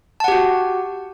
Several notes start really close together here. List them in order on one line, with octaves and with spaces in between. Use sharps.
A5 F#5 G4 F#4